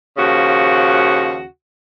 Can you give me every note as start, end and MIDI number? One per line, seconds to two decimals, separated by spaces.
0.18 1.44 39
0.18 1.44 49
0.18 1.44 53
0.18 1.44 66